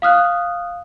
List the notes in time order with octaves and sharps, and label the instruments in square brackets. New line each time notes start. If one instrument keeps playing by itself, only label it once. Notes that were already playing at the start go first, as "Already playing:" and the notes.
[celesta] F5 D#6 F6 F#6